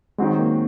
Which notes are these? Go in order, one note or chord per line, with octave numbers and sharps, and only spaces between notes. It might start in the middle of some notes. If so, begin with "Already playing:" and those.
D#3 F#3 G#3 C4 F#4
A#3